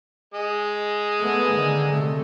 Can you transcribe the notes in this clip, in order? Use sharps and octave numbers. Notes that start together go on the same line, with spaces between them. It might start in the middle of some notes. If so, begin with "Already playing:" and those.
G#3 D#6
A3 B3
D3 D#3
C3 A3